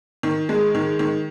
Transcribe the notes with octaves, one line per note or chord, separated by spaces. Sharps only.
D#3
G#3
D#3
D#3